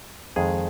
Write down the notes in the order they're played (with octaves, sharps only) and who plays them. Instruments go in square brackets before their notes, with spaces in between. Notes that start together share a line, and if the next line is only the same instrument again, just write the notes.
[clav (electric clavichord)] F2 D#3 G#3 G#4